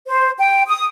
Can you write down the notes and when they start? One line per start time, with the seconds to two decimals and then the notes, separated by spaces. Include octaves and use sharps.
0.08 C5
0.38 G5
0.67 D#6